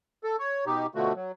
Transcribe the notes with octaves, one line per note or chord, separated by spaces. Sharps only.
A4
C#5
B2 D#4 G4
B2 D3 F3 A3 F#4
F#3